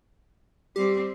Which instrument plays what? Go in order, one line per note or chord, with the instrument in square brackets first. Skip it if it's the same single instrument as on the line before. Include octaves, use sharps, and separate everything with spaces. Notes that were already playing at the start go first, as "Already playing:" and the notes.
[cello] G3 C4 [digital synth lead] G4